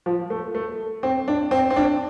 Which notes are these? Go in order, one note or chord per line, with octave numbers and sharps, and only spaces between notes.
F3
A3
A3
C4
D4
C4
C4
D4